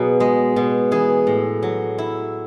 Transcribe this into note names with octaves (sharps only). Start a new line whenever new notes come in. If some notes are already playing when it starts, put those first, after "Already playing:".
Already playing: B2 F#3 F#4 G#4
G#3
B2
E3 G#4
A2
F#3
E4